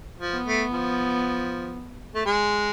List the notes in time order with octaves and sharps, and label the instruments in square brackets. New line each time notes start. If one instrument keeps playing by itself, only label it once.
[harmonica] F3
[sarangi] B3
[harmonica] A3
F3
A3
G#3